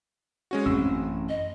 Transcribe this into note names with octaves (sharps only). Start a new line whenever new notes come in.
G#3 C#4 F#4
A1 F#2 C4 C#4 E6
D#5